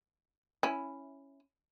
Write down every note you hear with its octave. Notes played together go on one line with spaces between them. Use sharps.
C#4 E4